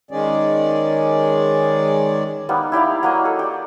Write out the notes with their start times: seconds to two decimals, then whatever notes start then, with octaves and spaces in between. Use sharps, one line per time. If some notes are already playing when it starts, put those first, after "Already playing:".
0.11 D#3 G#3 C#4 G#4 D5
2.49 G3 A#3 B3 D#4
2.72 E4 G4 D5 F5
3.03 F#3 A#3 D#5
3.25 A4
3.39 G4 D5